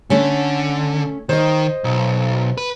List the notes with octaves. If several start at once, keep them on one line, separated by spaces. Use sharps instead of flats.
D3 A3 C#4
D#3 C5 D#5
B1
B4